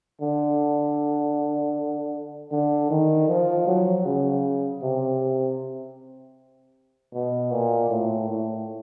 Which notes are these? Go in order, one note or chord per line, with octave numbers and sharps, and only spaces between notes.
D3
D3
D#3
F3
F#3
C#3
C3
B2
A#2
A2
A2